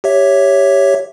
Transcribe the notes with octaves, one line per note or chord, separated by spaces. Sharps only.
G4 C#5 E5